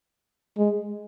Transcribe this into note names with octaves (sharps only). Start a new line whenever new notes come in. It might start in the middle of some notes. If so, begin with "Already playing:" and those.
G#3